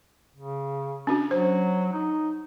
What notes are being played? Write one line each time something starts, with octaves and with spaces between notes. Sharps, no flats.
C#3
C#4 D4 F#4
F#3 C5
D#4